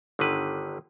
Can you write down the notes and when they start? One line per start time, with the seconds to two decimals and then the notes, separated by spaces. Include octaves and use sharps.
0.19 G1 D3 D#3 B4